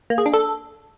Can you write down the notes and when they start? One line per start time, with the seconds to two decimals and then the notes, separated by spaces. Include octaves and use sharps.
0.10 A#3
0.18 G#4
0.26 D4
0.33 A4